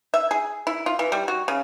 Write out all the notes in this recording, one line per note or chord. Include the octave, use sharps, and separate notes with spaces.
E5
G#4
E4
F4
E3
G3
F#4
C#3